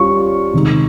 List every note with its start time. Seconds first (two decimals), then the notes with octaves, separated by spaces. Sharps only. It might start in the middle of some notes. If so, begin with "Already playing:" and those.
Already playing: G3 C#4 F4 C#6
0.53 C3 D#3 G#3 D#4